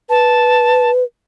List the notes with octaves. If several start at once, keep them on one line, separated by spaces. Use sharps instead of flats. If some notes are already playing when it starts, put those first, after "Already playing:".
B4 A5